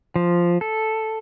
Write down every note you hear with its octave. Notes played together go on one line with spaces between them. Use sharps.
F3
A4